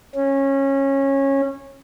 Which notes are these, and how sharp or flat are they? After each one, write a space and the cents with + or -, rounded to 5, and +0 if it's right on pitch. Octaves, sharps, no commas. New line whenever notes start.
C#4 -20